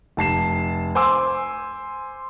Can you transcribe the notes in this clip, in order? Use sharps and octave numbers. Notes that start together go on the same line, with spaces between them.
F1 A5 C7 E7
C5 G#5 C6 D6 E6